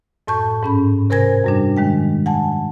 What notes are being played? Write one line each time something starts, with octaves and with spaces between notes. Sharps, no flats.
F#2 A2 A5 C#6 G6
G#2 C#4 B5
C3 A#4 C5 G#5 G#6 A#6
F#2 G3 D4
D#3 G#3 G5
F#5 G#5 A5